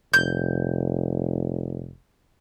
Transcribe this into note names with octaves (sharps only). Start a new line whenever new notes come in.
F1 G6